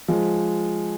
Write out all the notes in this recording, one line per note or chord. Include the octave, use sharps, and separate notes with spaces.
F3 G#3